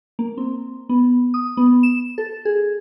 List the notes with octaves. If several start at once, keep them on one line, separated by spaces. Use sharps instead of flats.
A#3
C4
B3
D#6
B3
E7
A4
G#4